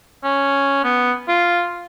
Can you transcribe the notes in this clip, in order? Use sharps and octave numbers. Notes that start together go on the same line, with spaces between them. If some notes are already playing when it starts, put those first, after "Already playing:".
C#4
B3
F4